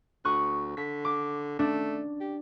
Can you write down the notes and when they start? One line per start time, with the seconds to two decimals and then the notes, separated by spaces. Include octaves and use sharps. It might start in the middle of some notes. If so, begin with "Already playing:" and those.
0.25 D2 C#6 D#6 F#6
0.77 D3 B6
1.05 D6
1.59 A3 D4
2.20 G4